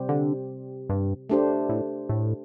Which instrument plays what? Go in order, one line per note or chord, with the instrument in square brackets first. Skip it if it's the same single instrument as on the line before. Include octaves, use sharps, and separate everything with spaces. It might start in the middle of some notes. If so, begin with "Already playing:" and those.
Already playing: [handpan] C3 G3 C4 G4 C5
[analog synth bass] D3
G2
[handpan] A3 D4 G4 C5
[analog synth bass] A2
A2